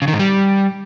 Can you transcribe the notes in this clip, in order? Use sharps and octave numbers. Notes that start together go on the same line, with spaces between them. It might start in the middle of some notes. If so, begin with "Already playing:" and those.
C#3
D#3
G#2
G3